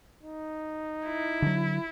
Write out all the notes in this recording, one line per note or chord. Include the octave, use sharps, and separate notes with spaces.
D#4
E4
D3 F#3